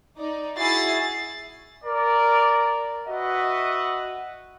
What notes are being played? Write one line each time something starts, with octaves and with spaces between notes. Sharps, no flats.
D#4 D5
E4 F#4 G#4 E5 A6 C7
A#4 D5
F#4 B4 D#5 E5 F#5